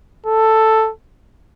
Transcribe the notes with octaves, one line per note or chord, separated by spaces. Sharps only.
A4